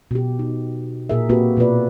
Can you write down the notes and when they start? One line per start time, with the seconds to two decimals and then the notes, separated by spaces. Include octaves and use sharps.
0.11 B2 G4
0.39 D#4
1.09 A#2 G#4 A#4 E5
1.29 A#3 C4 F#4 G4 B4
1.57 B2 A#3 F4 B4 D5